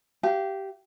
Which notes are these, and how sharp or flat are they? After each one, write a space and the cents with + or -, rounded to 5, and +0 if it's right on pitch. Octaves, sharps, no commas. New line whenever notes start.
G4 -15 F5 -35